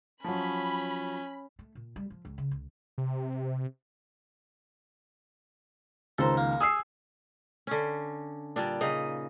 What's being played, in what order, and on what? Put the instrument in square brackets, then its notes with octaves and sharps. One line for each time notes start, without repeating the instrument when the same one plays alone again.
[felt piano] F3 F#3 [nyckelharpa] C#4 [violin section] B5
[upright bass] A3
A#2
G3
F3
C#2
C#3
C#2
[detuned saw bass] C3
[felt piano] C#2 D#3 A#5 [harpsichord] A4 C5
[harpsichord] A#3
[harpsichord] G#4 [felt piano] D#6 E6 C7
[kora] D3 C#4
A#2 G3 D4
C#3 D#4 D#5